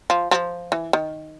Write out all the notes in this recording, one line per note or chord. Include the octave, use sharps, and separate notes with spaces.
F3
F3
E3
D#3